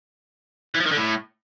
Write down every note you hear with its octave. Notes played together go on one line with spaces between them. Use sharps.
E3
F3
D#3
D3
A2